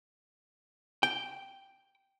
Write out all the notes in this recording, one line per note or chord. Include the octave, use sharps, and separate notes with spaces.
G5